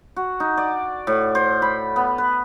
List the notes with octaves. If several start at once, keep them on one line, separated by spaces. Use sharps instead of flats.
F#4
D#4
D5
A2
C5
B5
B3
B4